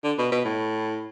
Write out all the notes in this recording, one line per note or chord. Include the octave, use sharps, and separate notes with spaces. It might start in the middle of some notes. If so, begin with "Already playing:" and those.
D3
B2
B2
A2